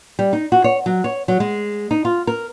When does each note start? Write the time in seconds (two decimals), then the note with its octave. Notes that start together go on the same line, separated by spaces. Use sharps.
0.19 G3
0.33 D#4
0.52 F#4
0.64 C#5
0.86 F#3
1.04 C#5
1.28 F#3
1.40 G#3
1.91 D#4
2.05 F4
2.27 A#4